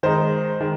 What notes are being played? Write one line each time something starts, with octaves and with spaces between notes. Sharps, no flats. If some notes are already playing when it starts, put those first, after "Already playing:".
D#3 G#3 D#4 C5
D#3 G#3